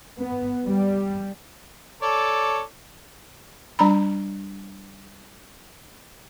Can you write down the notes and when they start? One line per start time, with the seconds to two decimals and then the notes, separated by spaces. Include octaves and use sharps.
0.20 B3
0.68 G3
2.02 A4 C#5 D5
3.79 G3 D4 A#5 B5